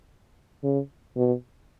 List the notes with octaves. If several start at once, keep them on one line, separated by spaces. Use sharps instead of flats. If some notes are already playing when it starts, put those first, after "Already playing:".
C#3
B2